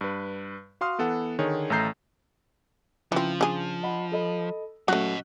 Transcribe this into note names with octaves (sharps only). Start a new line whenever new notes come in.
G2 B4
F#4 F5 C6 D#6 F6
E3 B3 A4 F#5
D3 D#3 G#4 C#5
A1 A3 A4 A#5 G6 C7
C#3 E3 F3 C4 F4
D4 G#4
D#5 F#5 B5
A4 D#5 B5
F#3 A3 C#4 F#4 D#5 F#5 F#6